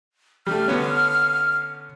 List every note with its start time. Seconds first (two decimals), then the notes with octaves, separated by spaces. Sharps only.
0.47 G3 A3 F6
0.68 D3 B3 C#4